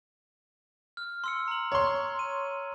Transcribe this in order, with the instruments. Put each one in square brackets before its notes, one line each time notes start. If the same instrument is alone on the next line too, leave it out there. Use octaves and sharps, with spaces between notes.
[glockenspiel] F6
C6 E6 C#7
A#5 F#7
[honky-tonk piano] C#5 C6 [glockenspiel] A#5
[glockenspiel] D#7